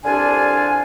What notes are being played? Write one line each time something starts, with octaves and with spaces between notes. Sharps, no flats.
C2 D3 D4 F4 G#5